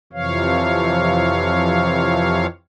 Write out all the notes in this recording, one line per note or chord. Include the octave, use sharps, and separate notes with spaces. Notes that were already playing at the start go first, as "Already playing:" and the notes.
F2 C3 E3 F3 C#5 F5